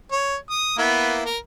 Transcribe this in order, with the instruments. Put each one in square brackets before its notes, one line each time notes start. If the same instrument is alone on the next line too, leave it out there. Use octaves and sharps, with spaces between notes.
[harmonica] C#5
D#6
A#3 B3 E4
A#4